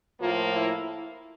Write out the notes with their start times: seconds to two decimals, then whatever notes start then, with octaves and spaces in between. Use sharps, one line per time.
0.20 A2 F3 A#3 F4
0.52 E4